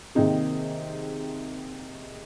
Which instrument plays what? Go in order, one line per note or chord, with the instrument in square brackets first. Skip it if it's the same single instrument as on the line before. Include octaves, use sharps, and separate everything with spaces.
[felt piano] C3 D#3 A#3 C4 D#4 G#4